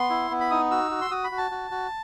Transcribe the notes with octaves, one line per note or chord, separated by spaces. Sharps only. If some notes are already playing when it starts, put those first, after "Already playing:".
Already playing: B3 C6
E4
B3
B5
D#4 D#6
F#4 E6
F#4
C6
F#4 D#6
B5
F#4
A5
F#4
F#4